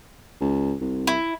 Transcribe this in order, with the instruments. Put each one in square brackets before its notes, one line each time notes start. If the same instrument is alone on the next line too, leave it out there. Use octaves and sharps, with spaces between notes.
[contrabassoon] C#2
C2
[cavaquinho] E4